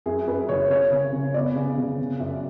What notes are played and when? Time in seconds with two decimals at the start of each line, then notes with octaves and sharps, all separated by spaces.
0.06 F#2 G#4
0.27 F#2 B4
0.49 F#1 C#5
0.70 C#3 C#5
0.92 C#3
1.13 C#3
1.34 B3 D5
1.55 C#3
1.77 C#3
1.98 C#3
2.20 F#2